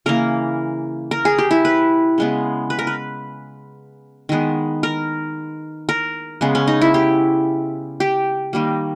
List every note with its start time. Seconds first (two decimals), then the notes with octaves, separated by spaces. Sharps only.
0.06 C#3 E3 A#3 A#4
1.11 A#4
1.25 G#4
1.38 G4
1.51 E4
1.65 B4
2.18 C#3 G#3 B3
2.70 B4
2.79 A#4
2.87 B4
4.29 D#3 G#3 B3
4.83 A#4
5.89 A#4
6.41 C#3 G#3 B3
6.55 C#4
6.67 D#4
6.81 E4
6.94 G4
8.00 G4
8.53 D#3 G3 A#3